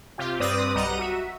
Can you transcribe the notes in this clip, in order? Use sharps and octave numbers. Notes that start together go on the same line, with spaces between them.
C3 F4 G4
G2 C4 B4 D5 D#6 A#6
B1 G3 D#5 F#5 A#5 D#7
F#4 E5